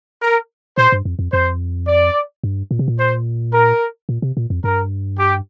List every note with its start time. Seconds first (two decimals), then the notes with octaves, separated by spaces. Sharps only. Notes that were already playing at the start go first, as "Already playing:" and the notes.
0.22 A#4
0.78 A#2 C5
0.92 G2
1.05 F2
1.19 F2
1.33 F2 C5
1.88 D5
2.44 G2
2.71 A#2
2.79 C3
2.88 A#2
2.99 C5
3.53 A#4
4.09 A#2
4.22 C3
4.37 A#2
4.50 F2
4.64 G2 A#4
5.19 G4